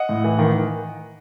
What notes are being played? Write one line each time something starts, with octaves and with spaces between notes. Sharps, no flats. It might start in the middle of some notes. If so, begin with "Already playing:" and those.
Already playing: D#5 F#5
A2
E3
D#3